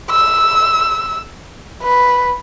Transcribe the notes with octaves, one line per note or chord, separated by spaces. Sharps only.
E6
B4